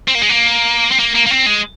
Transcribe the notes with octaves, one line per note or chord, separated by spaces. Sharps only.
C4
A#3
G#3
A#3
C4
A#3
A#3
A#3
C4
G#3